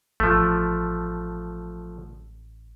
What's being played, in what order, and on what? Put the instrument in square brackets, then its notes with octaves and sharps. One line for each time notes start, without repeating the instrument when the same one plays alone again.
[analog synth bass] A1 [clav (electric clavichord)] F3 A3